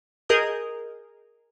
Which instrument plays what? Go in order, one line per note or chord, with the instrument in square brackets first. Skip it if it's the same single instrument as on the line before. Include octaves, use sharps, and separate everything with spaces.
[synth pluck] G#4 A#4 D#5 D#6 G6